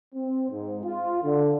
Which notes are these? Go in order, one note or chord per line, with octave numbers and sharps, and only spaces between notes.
C4
G#2
F4
D3